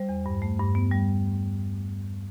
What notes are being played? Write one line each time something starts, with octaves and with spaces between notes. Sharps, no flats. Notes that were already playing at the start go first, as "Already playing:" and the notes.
Already playing: G3 C5
E2
G2
A3
G2
B3
G3